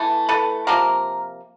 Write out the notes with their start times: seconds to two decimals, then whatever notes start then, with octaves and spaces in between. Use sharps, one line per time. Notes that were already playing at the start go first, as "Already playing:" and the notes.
Already playing: E3 A3
0.29 A4 B4
0.67 C3 F3 A#3 A#4